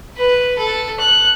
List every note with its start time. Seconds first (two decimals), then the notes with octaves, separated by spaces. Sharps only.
0.17 B4
0.58 A4
1.00 F#6